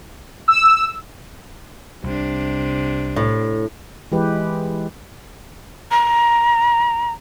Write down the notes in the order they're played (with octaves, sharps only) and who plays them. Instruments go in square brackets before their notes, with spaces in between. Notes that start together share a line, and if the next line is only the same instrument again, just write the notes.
[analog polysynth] E6
[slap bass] C2 [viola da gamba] C3 D4
[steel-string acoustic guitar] A2
[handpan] E3 G#3 G4 B4
[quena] A#5